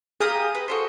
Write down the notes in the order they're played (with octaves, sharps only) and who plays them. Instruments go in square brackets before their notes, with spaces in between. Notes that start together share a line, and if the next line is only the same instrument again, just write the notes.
[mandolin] G4 F5 A#5 [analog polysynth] G#4 D#6
[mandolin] B4
F#4 A4 C5